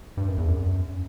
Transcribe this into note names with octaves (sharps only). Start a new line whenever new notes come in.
G2
F#2
E2
F#2